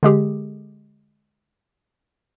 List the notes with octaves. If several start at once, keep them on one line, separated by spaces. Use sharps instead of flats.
D3 G#3 G4 G#4